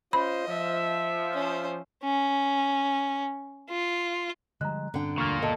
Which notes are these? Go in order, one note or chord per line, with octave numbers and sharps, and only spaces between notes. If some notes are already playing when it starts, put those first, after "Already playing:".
C#4 F4 C5 D#5 B5
F3 E5
C#4 C5
C#4
F4
D3 F3 G3 G#3 A#5 F#6
G2 D3 C4 C#4 G5
E1 D2 G2 A#2 A#3 C#6 F6
G1 D#2 B2 A4 D#5 A5